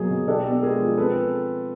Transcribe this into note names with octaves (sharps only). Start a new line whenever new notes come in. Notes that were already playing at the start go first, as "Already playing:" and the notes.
Already playing: B2 F#3 A#3 G#4
B2
D4 G4 A4
B3
G#3 G#4 A#4
F3
C4 A4 B4